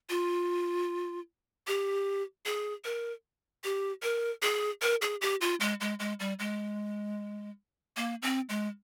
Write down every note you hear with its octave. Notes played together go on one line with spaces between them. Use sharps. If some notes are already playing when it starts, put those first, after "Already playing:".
F4
G4
G#4
A#4
G4
A#4
G#4
A#4
G#4
G4
F4
G#3
G#3
G#3
G3
G#3
A#3
C4
G#3